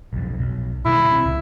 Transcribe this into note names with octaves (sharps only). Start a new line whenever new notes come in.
B1 F2
B1
B2 D#3 G3 E4
B2 E3 C4
C#2